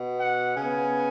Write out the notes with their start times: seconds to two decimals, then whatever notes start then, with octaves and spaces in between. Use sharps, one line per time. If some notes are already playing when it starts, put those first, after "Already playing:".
Already playing: B2 B3
0.17 F#5
0.57 C#3 B3 G#5